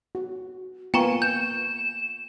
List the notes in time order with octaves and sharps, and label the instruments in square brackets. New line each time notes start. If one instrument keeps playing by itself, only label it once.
[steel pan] F#4
[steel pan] A#3 B3 F4 [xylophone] G5 A#5 C#6 [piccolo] G#5
[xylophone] G6 [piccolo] E7
[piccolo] E7